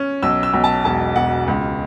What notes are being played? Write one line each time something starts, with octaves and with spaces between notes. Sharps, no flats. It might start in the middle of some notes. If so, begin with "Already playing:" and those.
Already playing: C#4
B1 E6
E6
B1
A5
E1 A5
E1 F#5
C#2